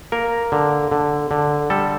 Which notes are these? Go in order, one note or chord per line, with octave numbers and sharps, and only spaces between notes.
A#3 A#4
D3
D3
D3
G3 A4